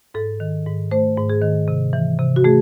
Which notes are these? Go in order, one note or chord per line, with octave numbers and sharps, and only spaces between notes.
G#2 A4
D#3
G#2
A3 C5
G#2
G#4
D#3
C3
E3
C3
F#4
A3 G#4